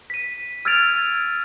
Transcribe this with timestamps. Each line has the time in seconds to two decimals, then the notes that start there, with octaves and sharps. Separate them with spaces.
0.10 B6 D#7
0.65 E6 F6 G#6 A6 D7 F7